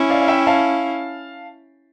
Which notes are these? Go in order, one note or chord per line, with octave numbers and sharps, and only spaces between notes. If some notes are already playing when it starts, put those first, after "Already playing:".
Already playing: C#4 E4
D5 F5
F5
E5 G5
F5 A5